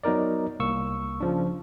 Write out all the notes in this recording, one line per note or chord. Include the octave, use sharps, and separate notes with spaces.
F#3 B3 D#4 A#4 D5
C2 A#3 C#6 E6
C#3 F3 D4